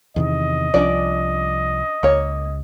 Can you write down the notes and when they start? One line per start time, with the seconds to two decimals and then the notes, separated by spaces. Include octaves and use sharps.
0.16 E2 C3 D#3 D#5
0.74 C2 F3 C#4 D4 D5
2.03 C#2 A#3 C#5